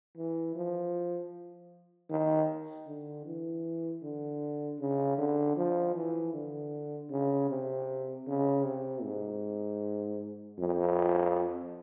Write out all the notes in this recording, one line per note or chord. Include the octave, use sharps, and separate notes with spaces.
E3
F3
D#3
D3
E3
D3
C#3
D3
F3
E3
D3
C#3
C3
C#3
C3
G#2
F2